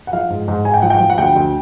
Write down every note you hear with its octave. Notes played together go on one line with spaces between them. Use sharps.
F#5
F3 F5
G#2
G#2
G#2 G#5
G5
F3 F#5
G5
F3
F#5
D2 G5
D2